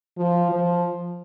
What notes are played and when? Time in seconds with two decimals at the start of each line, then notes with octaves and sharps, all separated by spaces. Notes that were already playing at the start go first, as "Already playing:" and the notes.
0.17 F3
0.51 F3